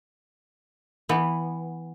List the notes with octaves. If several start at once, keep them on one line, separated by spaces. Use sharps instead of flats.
E3 B3